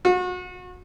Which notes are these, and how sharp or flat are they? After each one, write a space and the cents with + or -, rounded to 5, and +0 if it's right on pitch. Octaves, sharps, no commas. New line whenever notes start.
F#4 -35